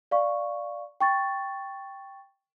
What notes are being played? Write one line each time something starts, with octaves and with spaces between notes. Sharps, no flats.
D5 F5 C#6
G5 C#6 A6